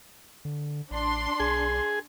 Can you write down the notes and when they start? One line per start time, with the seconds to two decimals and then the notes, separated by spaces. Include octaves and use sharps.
0.45 D3
0.91 A1 D4 C6
1.40 B1 G#4